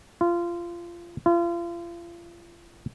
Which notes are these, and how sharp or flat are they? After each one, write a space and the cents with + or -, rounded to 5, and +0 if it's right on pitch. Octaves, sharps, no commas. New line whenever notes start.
F4 -20
F4 -35